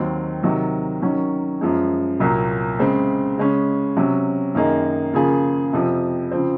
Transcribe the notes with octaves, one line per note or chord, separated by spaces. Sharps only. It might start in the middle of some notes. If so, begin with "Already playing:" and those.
Already playing: D#2 D#3 F#3 C4
C3 D#3 F#3
D#3 F#3 C#4
F#2 F3 G#3
C2 A#2 F#3 A#3
C#3 G#3 C4
C#3 G#3 C#4
C3 F#3 C#4
F#2 D#3 A#3 D#4 G#4
C#3 F3 A#3 F4 G#4
F2 C3 F3
C#3 F3 C4